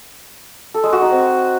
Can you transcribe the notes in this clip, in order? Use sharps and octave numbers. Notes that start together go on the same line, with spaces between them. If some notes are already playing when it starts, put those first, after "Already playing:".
A4
G#3
F#4
D#4
C4